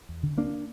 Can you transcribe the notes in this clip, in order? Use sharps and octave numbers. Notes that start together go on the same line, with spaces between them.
E2
D3
D2 A#3 D4